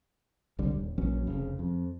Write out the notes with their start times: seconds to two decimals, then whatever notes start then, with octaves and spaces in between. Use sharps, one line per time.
0.59 C2 D3 G3
0.71 D#1
0.98 A#1 E3 F#3 C#4
1.27 F1 C#3
1.59 F2